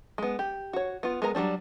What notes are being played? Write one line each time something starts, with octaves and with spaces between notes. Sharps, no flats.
G#3 B3
G4
F#4 C#5
B3 F4
G#3 B3 A#4 A#5
F#3 G3 C4 D4